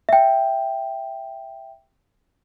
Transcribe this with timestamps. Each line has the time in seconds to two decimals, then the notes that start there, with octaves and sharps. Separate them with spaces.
0.09 E5 G5